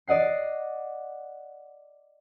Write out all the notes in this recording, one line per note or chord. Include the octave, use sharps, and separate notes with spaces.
D5 D#5 F#5 C7